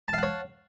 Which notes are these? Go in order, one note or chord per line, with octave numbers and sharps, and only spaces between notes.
C#5 F5 F#5 A5